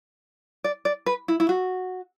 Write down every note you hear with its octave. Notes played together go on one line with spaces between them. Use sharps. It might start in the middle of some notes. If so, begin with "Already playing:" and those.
D5
D5
B4
E4
E4
F#4